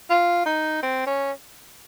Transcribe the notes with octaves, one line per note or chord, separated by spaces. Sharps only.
F4
D#4
C4
C#4